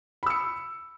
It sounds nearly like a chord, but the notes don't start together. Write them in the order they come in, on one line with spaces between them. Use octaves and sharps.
B5 E6 C#7